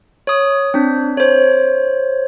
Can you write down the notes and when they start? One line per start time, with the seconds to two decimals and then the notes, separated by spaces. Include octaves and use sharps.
0.27 C#5 D#6
0.74 C4 D4
1.17 C5 C#5